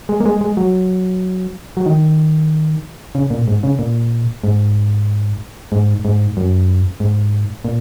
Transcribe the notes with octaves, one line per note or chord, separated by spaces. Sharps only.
G#3
A#3
G#3
G#3
F#3
F#3
D#3
C#3
A#2
G#2
C#3
A#2
G#2
G#2
G#2
F#2
G#2
A#2